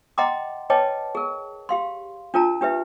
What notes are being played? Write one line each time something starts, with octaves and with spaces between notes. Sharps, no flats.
D#5 F#5 G5 A#5 C6 D6
B4 C#5 D#5 G5 A5 D6
G#4 A#4
G4 F5 C6
D4 F4 A#4 A5 A#5
D4 G4 B4 E5